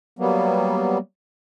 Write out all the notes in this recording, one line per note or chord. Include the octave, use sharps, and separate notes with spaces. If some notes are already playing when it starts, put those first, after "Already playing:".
F#3 G3 A#3 B3